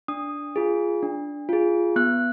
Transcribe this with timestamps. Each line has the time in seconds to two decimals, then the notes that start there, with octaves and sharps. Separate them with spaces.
0.08 D4 D#6
0.56 F4 G#4
1.03 D4
1.49 F4 G#4
1.96 B3 F#6